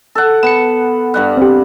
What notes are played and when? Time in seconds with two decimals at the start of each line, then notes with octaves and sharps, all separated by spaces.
0.15 A4 F#5
0.43 B3 C#7 E7
1.14 G2 G3 F#5
1.37 C4 G4